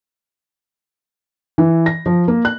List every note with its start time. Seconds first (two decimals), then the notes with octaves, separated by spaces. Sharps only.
1.58 E3
1.86 A#6
2.06 F3
2.28 A#3
2.45 F#6